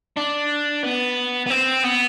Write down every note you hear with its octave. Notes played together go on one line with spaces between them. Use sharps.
D4
B3
B3
C4
B3